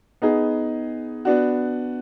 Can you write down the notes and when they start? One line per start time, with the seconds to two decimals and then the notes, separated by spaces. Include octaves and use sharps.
0.22 B3 D#4 G#4
1.25 B3 D4 F#4